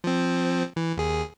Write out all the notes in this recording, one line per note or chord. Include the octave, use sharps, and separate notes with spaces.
F3 C4
E3
D#2 G#4